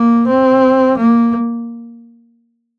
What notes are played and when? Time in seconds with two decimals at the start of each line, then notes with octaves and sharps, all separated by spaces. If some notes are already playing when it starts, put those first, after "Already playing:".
Already playing: A#3
0.28 C4
0.97 A#3